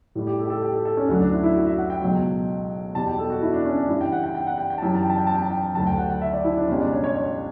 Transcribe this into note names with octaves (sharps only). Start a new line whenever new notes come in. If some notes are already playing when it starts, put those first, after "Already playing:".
A2 G3
G4
A4
G4
A4
G4
A4
A4
C#4
D2 D3 F#3 D4
D4
E4
E4
F#4
E5
F#5
G5
C#2 B2 F#3
E2 B2 G3 A5
G5
A4
F#4
E4
D4
C#4
D4
G2 E3 G3 E4
G5
F#5
G5
G5
F#5
G5
G5
A5
F#2 E3 G3 G5
A5
G5
A5
G5
A5
G5
A5
G5
D2 D3 F#3 A5
G5
F#5
F#5
E5
D5
E4
D4
C#2 B2 G3 C#4
D4
C#5
C#5
C#5